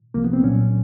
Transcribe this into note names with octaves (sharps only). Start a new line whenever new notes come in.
C2 C3 F3 A#3
B3
C4
C2 A#2 F#3 C#4